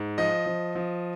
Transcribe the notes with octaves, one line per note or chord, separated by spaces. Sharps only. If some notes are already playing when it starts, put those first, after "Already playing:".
Already playing: G#2
F3 D#5
F3
F3